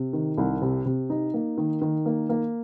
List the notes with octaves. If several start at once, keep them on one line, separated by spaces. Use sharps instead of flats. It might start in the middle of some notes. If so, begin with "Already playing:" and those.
Already playing: C3
D#3
C2
C3
C3
D#4
A#3
D#3
D#3
A#3
A#3